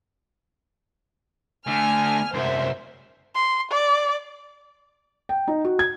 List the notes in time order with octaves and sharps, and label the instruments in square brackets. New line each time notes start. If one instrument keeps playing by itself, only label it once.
[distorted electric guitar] D3 A3 [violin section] G#5 F6
[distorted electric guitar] C2 F#2 [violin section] C5 E5
[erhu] C6
D5
[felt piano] G5
D#4
F#4
G#6